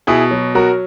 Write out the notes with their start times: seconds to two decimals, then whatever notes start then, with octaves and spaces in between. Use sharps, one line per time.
0.07 B2 E4 G#4
0.31 F#3
0.55 F#3 F#4 A#4